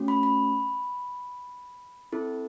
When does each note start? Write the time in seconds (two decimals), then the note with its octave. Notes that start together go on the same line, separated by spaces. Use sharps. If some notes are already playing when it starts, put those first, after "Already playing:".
Already playing: A3 C#4 F#4
0.08 B5
0.23 B5
2.12 C4 E4 A4